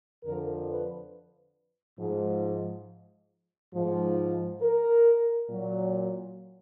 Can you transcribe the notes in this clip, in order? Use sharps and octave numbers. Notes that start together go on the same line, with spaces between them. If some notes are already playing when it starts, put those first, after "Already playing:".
F2 D3 F3 A#4
B4
G#2 F3
G#2 F3
A#4
A#2 F#3